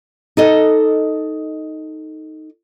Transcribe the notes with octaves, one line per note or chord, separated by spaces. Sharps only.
D#4 A4 D#5